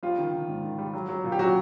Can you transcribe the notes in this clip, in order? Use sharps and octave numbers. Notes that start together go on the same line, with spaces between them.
F3 G3 F4
D#3
D#3
G#2
D#3
G3
F#3
F#3
A#2
G4
A#2 F#3 F#4